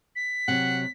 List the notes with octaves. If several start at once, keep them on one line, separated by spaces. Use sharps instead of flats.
B6
C3 F#3 F#5